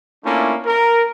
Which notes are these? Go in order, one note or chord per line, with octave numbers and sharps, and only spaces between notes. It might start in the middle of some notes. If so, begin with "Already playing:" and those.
A3 A#3 C#4 D4 E4 F4
A#4